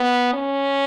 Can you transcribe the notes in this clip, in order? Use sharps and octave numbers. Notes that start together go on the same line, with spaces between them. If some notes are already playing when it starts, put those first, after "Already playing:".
Already playing: B3
C#4